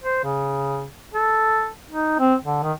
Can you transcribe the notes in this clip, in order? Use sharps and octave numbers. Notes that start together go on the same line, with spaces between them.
C5
C#3
A4
D#4
C4
D3
D#3